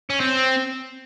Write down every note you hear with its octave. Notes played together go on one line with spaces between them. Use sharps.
C#4
C4